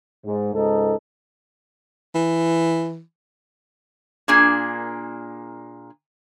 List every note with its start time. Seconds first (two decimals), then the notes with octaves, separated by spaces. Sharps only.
0.25 G#2
0.54 C#2 G#2 D#4 A4
2.15 E3
4.28 A#2 A#3 D4 G#4